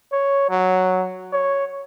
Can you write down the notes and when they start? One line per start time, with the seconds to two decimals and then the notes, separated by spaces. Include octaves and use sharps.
0.12 C#5
0.49 F#3
1.32 C#5